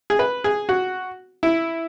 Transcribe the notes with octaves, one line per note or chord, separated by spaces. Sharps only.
G#4
B4
G#4
F#4
E4